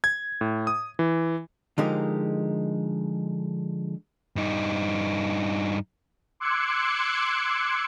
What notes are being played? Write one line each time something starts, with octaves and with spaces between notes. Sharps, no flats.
G#6
A2
D#6
E3
D3 F3 G#3 D#4 G4 A#4
G2 D#4
C6 D6 E6 F#6 G#6 C#7